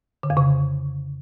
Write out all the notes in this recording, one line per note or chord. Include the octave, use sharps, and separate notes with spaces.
D3
F2
C#3